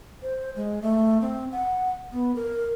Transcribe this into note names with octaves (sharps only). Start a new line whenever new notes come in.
C5
G#3
A3
C4
F#5
B3
A#4